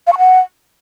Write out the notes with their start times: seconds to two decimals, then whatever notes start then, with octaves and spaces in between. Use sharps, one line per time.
0.07 F5
0.13 C#6
0.18 F#5